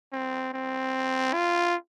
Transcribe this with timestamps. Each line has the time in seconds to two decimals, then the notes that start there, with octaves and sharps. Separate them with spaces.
0.13 C4
0.53 C4
1.33 F4